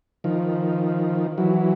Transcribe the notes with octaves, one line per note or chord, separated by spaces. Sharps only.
D#3 F3
E3 F#3